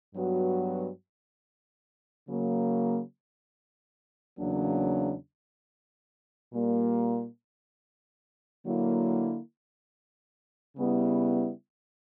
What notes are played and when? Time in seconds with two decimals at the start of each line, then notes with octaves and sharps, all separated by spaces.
0.14 G2 F#3 B3 F#4
2.28 C#3 F#3 A#3
4.39 E2 C#3 F#3 A#3 D4
6.53 A#2 G3 A#3
8.64 D3 F#3 A#3 E4
10.77 C#3 G3 B3 E4